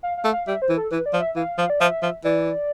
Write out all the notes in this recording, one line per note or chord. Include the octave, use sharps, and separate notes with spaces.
F5
F5
A3
F5
G3 E5
C5
E3
A4
E3 B4
D5
F3
E5
E3 F5
F3
D5
F3 E5
F3
E3 D5